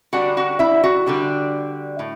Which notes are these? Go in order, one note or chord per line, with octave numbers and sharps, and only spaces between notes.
D3 G3 D4 F#4 F#5
F#4 F#5
E4 E5
F#4
D3 G3 D4
A2